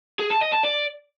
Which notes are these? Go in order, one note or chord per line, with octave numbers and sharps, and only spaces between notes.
G#4
A5
D#5
A5
D5